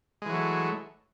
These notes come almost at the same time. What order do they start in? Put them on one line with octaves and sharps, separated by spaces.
G#3 E3 F#3 A3